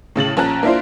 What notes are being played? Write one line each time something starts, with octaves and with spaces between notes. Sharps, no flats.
A2 C#3 A6 F#7
A#1 A#3 C#4 A5 A#5 F#6
A#3 D4 E4 F4 C5